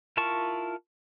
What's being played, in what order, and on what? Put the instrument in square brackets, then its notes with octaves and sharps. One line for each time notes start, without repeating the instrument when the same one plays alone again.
[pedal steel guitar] E4 F4 A#4 A5 C#6